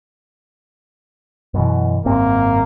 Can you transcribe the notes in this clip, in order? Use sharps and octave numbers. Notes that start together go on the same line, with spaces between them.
F#2 B2 E3
G#1 F#2 A#3 C4